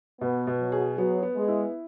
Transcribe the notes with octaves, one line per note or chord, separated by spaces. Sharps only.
B2 B3
B2
F#3
G#4
F#3 B3
B3
G#3
E4